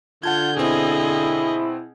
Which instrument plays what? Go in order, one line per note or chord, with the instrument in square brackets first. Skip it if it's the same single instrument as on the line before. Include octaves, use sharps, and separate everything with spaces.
[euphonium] D3 [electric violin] F4 G6 [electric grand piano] F#5 A5 G#6
[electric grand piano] B2 C4 [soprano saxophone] E4 [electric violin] G#4 D#5